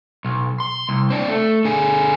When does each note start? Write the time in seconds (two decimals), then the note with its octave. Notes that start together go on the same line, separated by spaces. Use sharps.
0.25 B1
0.60 C6
0.89 C2
1.10 C4 D4
1.29 A3
1.65 D3 G#4